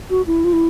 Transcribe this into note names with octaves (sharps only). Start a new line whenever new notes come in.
F#4
E4
F4
E4